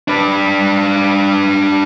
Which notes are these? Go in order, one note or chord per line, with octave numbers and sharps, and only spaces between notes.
D4 B4